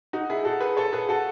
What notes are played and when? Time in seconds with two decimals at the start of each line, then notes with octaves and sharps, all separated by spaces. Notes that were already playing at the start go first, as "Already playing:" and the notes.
0.13 D#4 F#4
0.30 E4 G#4
0.45 F#4 A4
0.61 G#4 B4
0.77 A4 C#5
0.93 G#4 B4
1.09 F#4 A4